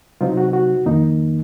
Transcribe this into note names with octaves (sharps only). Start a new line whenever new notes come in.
C3 F#3 C4 D#4 F4
F#4
F#4
F2 D#3 A#3 D#4